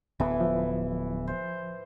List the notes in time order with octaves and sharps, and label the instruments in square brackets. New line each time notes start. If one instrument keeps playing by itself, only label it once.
[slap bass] D1 B3 [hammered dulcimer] E3 E4
[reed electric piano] F3
[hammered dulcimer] C5